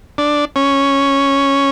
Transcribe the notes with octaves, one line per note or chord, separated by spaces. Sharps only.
D4
C#4